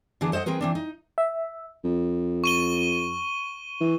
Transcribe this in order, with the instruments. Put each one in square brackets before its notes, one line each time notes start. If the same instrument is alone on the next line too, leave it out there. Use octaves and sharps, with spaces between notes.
[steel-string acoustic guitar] D3 E3 B3 D4 G#4
A4 C5 C#5 D#5 F#5
E3 C4 G#4 A#4 B4
E3 C4 D4
D#4
[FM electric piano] E5
[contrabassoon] F2
[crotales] C#6 D#7 G7
[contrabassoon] E3